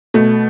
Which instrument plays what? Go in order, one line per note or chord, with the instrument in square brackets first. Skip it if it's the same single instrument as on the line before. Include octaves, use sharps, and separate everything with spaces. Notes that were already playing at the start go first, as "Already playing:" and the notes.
[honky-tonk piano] B2 A3